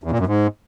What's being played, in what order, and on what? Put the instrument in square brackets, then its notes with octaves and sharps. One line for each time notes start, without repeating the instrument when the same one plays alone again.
[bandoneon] E2
A#2
F#2
G#2